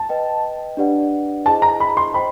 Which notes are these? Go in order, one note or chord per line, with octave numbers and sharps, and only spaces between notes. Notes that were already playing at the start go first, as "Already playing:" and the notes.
Already playing: A5
B4 D#5 G5
D4 G4 B4 D5 F#5
E4 G#4 C5 D#5 A5
A#5
B5
C6
C5 D#5 G5 B5